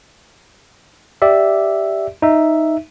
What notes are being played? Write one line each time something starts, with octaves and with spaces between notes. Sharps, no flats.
G4 D5 E5
D#4 E5